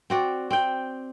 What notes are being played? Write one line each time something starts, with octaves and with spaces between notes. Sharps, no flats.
C4 F#4 D5
C4 G5